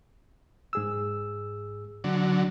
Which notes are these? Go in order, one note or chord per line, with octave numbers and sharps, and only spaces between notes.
G#2 G#4 E6
D3 F#3